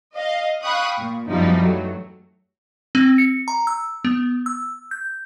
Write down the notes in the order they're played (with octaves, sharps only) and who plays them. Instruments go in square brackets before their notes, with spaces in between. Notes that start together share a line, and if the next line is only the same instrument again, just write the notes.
[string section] D#5 F5
F5 G5 B5 C#6 D#6 F#6
A#2
F#2 E3 F3 G3 B3 D#4
F#3 A3
[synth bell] C4
C#7
A#5
E6
B3
E6
G6